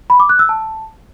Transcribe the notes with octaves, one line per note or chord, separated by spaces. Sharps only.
B5
D6
F#6
E6
A5